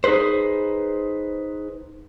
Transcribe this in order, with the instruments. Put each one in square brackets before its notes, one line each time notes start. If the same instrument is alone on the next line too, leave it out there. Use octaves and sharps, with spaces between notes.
[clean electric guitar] D#4 G#4 A4 B4 C5